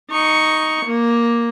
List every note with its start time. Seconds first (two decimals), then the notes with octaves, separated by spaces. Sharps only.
0.11 D#4 C#6
0.85 A#3